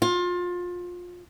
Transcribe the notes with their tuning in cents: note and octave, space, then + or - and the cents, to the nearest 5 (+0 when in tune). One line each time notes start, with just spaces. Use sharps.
F4 +25